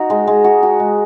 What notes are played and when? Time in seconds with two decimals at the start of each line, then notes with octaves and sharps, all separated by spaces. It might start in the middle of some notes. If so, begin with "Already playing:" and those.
Already playing: D#4 F#4
0.10 G#3
0.27 G#3
0.44 F#4
0.63 F#4
0.80 G#3